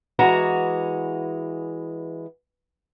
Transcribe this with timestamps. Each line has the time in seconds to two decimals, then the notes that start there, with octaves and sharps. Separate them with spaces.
0.19 E3 G#3 F#4 A#5